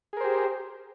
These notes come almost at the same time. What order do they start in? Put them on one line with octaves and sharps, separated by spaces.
G#4 A#4 C5 G4